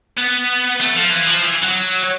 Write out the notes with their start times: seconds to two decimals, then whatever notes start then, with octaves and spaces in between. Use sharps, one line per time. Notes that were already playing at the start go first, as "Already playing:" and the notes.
0.17 B3
0.81 A3
0.95 F3
1.11 E3
1.27 F3
1.43 E3
1.64 F#3